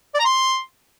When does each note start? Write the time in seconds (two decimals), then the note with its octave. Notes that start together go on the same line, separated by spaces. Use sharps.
0.14 D5
0.19 A#5
0.25 C6